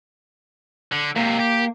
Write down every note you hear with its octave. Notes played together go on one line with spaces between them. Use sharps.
D3
G#2 C3 A#3
G4